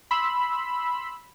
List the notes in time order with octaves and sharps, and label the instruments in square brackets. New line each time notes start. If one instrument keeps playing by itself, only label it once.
[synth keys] B5 C6 E6